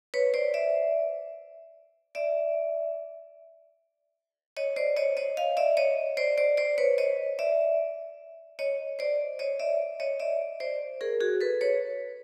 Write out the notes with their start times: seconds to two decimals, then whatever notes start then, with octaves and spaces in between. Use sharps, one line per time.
0.14 B4 C#5
0.34 C5 D5
0.54 D5 E5
2.15 D5 E5
4.57 C#5 D#5
4.76 C5 D5
4.97 C#5 D#5
5.17 C#5 D#5
5.37 D#5 F5
5.57 D5 E5
5.77 C#5 D#5
6.17 C5 D5
6.38 C5 D5
6.57 C5 D5
6.78 B4 C#5
6.98 C#5 D#5
7.39 D5 E5
8.59 C#5 D#5
8.99 C5 D5
9.39 C#5 D#5
9.60 D5 E5
10.00 C#5 D#5
10.20 D5 E5
10.60 C5 D5
11.01 G#4 A#4
11.21 F#4 G#4
11.41 A4 B4
11.61 B4 C#5